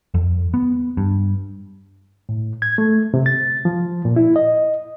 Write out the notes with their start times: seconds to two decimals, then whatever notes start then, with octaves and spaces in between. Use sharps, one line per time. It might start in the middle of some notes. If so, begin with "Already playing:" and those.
0.14 F2
0.54 B3
0.97 G2
2.29 A2
2.62 G#6
2.78 A3
3.14 C3
3.26 A6
3.65 F3
4.05 A#2
4.16 E4
4.36 D#5